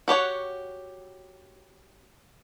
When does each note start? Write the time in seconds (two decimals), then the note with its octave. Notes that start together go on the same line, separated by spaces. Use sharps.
0.08 F#4 G4 C#5 F#5